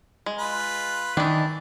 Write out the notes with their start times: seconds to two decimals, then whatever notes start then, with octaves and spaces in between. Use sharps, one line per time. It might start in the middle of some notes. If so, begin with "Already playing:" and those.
0.26 G#3
0.39 F4 B4
1.17 D#3 E3 D4